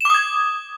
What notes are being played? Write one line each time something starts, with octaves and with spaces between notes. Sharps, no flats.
D6 D#6 G#6 E7